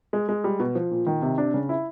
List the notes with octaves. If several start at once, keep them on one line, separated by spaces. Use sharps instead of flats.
G#3
G#3
G3
B2
F3
A#2
D#3
C3
D4
C#3
E4